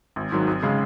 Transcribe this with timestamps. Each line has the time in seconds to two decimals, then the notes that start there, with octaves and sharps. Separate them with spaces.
0.16 G#1
0.32 G#2 D#3 F#3
0.47 G#1
0.63 C#3 G#3